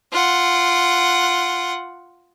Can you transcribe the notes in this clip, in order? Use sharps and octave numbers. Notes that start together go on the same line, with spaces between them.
F4 F#5